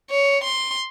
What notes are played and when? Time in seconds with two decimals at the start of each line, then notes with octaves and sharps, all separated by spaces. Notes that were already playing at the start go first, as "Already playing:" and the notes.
0.11 C#5
0.44 C6